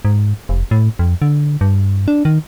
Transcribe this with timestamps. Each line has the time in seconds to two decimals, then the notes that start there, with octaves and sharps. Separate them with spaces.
0.05 G#2
0.49 F1
0.71 A2
0.99 F2
1.22 D3
1.61 G2
2.08 D4
2.25 D#3